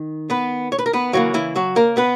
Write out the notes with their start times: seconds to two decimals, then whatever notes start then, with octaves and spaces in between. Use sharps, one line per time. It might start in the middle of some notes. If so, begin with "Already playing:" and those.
Already playing: D#3
0.30 B3 B4
0.72 C#5
0.79 B4
0.86 A#4
0.93 B3 B4
1.13 C#3 E3 F#3 A#3 F#4
1.34 E3 E4
1.56 F#3 F#4
1.76 A#3 A#4
1.97 B3 B4